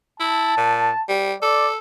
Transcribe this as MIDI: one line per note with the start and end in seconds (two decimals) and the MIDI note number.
0.20 0.53 64
0.20 1.01 81
0.57 0.90 46
1.09 1.33 55
1.42 1.78 69
1.42 1.68 74